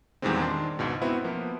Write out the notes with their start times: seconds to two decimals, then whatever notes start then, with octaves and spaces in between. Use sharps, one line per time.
0.22 E2 A#2 D#3 G3 G#3 C4
0.41 D#3 D4 C6
0.79 C#2 G#2 B2
1.01 B3 C4 E4 F#4
1.24 F3 A#3 B3